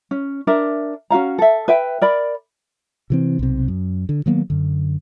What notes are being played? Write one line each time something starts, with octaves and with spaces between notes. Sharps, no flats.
C#4
D4 A#4 E5
C#4 F#4 F5 A#5
A4 E5
B4 E5 G5
A#4 D5 B5
C3 E3 C4
B1 C3
F#2
D3
D#3 F#3 A#3 B3
F#2 D3